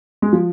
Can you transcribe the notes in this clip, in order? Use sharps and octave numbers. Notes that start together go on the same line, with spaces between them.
G#3
F3